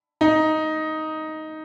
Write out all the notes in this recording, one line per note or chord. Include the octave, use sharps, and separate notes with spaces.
D#4